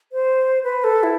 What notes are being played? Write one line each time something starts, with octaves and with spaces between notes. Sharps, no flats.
C5
B4
A4
E4